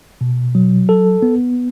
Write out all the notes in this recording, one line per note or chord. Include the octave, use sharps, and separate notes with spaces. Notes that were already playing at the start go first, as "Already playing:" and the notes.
B2
F#3
A4
B3